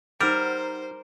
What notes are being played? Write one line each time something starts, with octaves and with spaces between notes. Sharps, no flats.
G3 D#4 A#4 C5 F#5 A#5